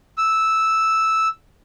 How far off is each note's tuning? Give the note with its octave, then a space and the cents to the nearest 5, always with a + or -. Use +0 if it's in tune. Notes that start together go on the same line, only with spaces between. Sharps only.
E6 -5